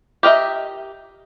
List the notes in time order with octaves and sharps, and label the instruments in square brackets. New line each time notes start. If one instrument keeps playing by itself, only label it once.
[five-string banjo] G4 A#4 D#5 E5